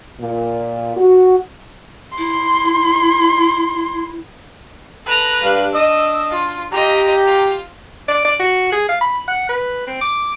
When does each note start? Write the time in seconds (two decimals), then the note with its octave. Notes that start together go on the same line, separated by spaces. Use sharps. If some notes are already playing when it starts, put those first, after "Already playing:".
0.21 A#2
0.97 F#4
2.18 E4 C6
5.07 A4 B4 A#5
5.42 G2 D4 F5
5.74 D#5 E6
6.31 F4
6.72 F4 G4 D#5 A#5
7.26 F4
8.08 D5
8.25 D5
8.39 F#4
8.72 G#4
8.89 F5
9.01 B5
9.27 F#5
9.49 B4
9.87 C4
10.01 D6